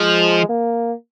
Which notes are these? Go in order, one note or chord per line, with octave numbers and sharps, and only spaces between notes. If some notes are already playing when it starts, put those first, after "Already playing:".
Already playing: F3 G#3
A#3